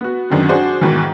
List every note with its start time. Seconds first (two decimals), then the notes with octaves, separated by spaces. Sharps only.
0.01 B3 F#4
0.30 F#2 D3 D#3 G#3 C4
0.49 D4 F#4 G#4 C5
0.81 G#2 B2 D#3 E3